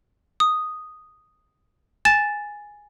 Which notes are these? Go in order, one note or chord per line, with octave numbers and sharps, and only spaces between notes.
D#6
G#5 A6 E7